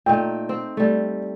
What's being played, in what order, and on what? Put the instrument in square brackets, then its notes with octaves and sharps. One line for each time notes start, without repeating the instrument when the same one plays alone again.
[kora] A#2 A3 D#4 [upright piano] G5
[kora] C4
G3 A3